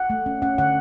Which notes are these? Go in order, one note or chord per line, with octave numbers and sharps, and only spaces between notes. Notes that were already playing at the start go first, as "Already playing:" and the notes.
Already playing: F#5
A3
C#4
C#4 F#5
D3 F#5